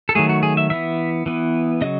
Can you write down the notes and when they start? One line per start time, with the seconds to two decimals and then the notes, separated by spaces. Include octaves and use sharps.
0.09 A4
0.15 D#3 F#3 A3 G#4
0.29 F#4
0.43 G#4
0.57 E5
0.70 E3 B3 E5
1.26 E3 B3
1.81 C#3 F#3 D#5